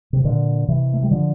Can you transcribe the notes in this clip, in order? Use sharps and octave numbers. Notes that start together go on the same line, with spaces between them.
C3
A#2 D3
C3 E3
A3
G3
D3 F3